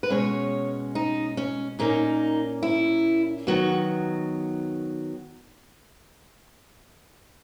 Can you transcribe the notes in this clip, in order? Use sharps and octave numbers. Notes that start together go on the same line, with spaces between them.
B4
B2 G#3 C#4 C#5
D#4
C#4
A#2 A#3 C#4 D#4
E4
D#3 F#3 B3 F#4